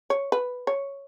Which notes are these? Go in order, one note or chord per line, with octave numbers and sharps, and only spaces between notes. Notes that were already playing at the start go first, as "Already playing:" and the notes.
C#5
B4
C#5